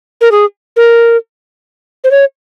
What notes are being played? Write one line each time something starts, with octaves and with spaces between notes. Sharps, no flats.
A#4
G#4
A#4
C5
C#5